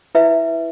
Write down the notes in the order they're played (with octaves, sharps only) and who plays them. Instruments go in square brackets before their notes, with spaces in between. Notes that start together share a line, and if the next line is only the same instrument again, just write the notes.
[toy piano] E4 B4 E5